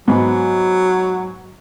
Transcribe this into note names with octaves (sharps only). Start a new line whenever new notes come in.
G#2 F#3 B3